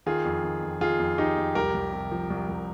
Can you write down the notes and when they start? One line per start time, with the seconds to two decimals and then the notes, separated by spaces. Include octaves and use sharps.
0.06 D#3 F4 G#4
0.25 F2
0.43 D#3
0.62 F2
0.81 D#3 F4 G#4
0.99 F2
1.18 D#3 D#4 G4
1.37 F2
1.55 C2 G4 A#4
1.74 C2
1.93 C3
2.11 F3
2.30 C2
2.49 C2